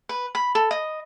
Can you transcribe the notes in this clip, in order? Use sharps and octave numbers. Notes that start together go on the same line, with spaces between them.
B4
B5
A4
D#5